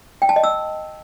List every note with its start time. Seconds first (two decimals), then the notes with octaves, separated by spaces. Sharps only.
0.22 G5
0.29 A5
0.36 D#5
0.44 E6